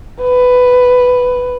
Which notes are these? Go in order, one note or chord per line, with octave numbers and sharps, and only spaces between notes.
B4